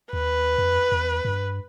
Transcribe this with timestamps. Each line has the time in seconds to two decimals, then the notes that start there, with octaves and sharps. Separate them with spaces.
0.13 D#2 B4
0.58 F2
0.92 E2
1.25 G2